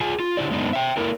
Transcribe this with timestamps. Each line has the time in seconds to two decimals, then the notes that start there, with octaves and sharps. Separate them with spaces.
0.01 F4 G#4 G#5
0.20 F4
0.37 D3 E4 G4 D5
0.51 F#2 G#3 A3 B3 D4 D#4
0.73 E5 G5
0.97 A#3 E4 A4 A#4